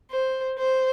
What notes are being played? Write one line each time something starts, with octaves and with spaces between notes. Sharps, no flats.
C5
C5